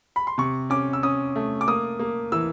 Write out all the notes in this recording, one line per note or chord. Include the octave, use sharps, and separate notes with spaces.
B5
C6
C3 C#6
C#4 D6
E6
C#4 D#6
A3
D6
A#3 D#6
A#3
E3 E6